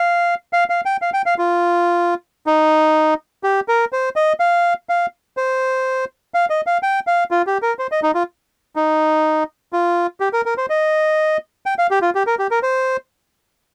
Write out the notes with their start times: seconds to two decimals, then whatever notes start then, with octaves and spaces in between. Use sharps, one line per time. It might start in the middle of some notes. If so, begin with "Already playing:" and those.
Already playing: F5
0.53 F5
0.70 F5
0.85 G5
1.02 F5
1.14 G5
1.26 F5
1.38 F4
2.46 D#4
3.43 G4
3.68 A#4
3.92 C5
4.16 D#5
4.40 F5
4.89 F5
5.37 C5
6.34 F5
6.50 D#5
6.66 F5
6.83 G5
7.07 F5
7.31 F4
7.47 G4
7.62 A#4
7.79 C5
7.92 D#5
8.03 D#4
8.15 F4
8.76 D#4
9.73 F4
10.20 G4
10.33 A#4
10.46 A#4
10.58 C5
10.70 D#5
11.66 G5
11.78 F5
11.91 G4
12.02 F4
12.15 G4
12.27 A#4
12.39 G4
12.51 A#4
12.63 C5